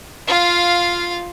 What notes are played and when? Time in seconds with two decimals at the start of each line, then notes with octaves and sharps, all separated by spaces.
0.27 F4 F5